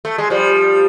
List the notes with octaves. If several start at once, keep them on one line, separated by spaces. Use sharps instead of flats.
A3
G#3
F3 G3